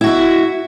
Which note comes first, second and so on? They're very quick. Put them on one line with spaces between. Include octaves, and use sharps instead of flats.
E4 F#4 E5